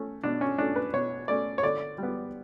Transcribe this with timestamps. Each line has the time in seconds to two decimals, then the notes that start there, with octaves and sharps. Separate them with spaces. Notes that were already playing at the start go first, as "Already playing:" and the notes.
Already playing: A3 C#4
0.23 B2 D4
0.41 C#4
0.58 A3 C#4 D4
0.76 B4
0.93 B2 C#5
1.28 A3 C#4 D5
1.58 C#5
1.63 D3 D5
1.98 G3 B3